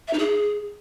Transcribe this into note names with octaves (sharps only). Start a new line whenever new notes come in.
E5
D#4
G#4